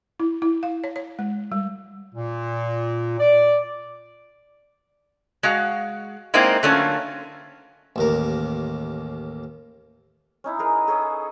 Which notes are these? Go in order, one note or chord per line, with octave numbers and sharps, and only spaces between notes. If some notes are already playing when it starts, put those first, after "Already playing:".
E4
E4
F5
C#5
C#5
G#3
G3
A#2
D5
G#3 F#4 F5
G#3 A#3 C4 D#4 E4
D3 F#3 A3 A#3 C#4 F4
A1 D#2 A#4
C#4 D#4 E4
G#4 A#4 B4
G#4 A4 C#5 D#5